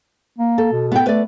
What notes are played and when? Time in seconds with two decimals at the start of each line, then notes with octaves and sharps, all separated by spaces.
0.39 A#3
0.58 A4
0.72 B2
0.92 B3 G5
1.06 A3 B4 D5